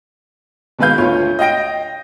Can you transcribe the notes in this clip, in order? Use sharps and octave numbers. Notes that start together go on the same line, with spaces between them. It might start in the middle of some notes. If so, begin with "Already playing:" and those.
B2 D#3 G#3 B4 F5 G6
D2 F4 C#5
D#5 F5 G5 A#6 D7